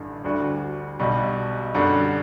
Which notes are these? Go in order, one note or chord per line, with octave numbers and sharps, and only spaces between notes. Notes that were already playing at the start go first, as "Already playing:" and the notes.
Already playing: A1 G2 D3
D2 D3 G3 D4 F#4
B1 B2 G3
F#2 D3 G3 D4 F#4